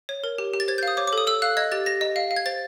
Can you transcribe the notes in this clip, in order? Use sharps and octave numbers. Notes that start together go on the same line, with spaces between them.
C#5
A#4
G4
G4
A6
C5 G#6
G6
F5 D#6
C#5 D6
D6
A4 D#6
A4 E6
F5 F#6
D#5 G#6
G4 A6
G4 A#6
D#5
F5
F5
G#6
C5 A6